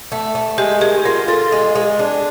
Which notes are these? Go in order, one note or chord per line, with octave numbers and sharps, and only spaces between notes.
A3
A3
G#3 G4
D#3 G#4
F4 A#4
F4 A4
G#3
G#3
D4